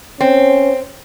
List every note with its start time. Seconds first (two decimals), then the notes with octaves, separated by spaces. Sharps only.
0.21 C4 C#4 C5